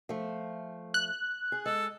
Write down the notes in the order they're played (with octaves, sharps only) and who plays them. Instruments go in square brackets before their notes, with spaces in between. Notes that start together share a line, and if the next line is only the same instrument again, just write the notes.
[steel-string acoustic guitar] F3 A3
[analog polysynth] F#6
[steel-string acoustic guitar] G#4
[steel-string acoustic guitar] G#3 [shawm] A4